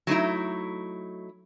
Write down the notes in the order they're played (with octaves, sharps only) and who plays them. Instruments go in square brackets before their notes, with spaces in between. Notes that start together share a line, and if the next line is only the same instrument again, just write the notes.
[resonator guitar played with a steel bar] F#3 A3 D#4 E4